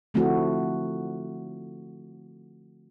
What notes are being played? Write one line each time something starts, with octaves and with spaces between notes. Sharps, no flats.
D3 F3 A3 C4 E4 F#4